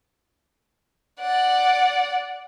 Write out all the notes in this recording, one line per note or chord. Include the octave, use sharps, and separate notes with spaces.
D5 F#5